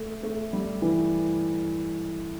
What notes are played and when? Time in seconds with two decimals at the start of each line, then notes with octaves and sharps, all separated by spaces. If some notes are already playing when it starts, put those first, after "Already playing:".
Already playing: A3
0.23 A3
0.53 G3
0.82 E3